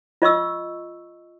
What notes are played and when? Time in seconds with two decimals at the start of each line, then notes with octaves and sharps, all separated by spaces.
0.22 F4 D#5 C#6 E6